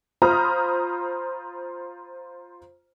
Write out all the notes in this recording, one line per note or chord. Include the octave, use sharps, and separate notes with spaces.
F4 C5 A#5 B5 D#6 F6